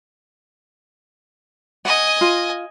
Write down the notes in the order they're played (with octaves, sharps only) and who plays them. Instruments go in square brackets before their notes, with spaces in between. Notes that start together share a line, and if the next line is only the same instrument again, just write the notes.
[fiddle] D#5 G#5 [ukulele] F#5
[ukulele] F4